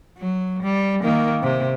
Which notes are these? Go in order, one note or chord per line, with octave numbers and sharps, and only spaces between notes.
F#3
G3
D#3 A#3
C3